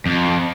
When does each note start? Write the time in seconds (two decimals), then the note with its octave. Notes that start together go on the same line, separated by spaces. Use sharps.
0.06 F2